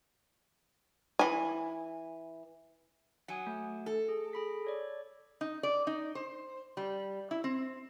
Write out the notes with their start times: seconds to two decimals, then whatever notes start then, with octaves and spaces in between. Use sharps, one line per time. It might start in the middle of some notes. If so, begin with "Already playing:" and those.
1.19 E3 G#5
3.28 F#3 F#5 G#5 D#6
3.47 A3
3.86 A4
4.09 G#4
4.33 G#4 B5 B6
4.65 A4 C#5 D5
5.41 D#4
5.63 D5
5.87 D#4
6.15 C5
6.77 G3
7.31 E4
7.44 C4